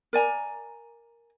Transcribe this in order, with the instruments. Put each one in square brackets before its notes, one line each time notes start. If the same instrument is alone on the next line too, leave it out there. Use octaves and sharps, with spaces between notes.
[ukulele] A#4 D5 G#5 A#5